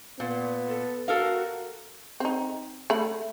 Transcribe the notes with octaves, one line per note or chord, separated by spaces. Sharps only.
A#2 B3
A4
F#4 A4 A#4 F5
C4 D#4
A3 B5